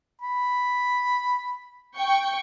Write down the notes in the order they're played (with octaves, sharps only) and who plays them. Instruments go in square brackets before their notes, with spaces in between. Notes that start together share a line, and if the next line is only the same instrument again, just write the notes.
[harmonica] B5
[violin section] G5 C#6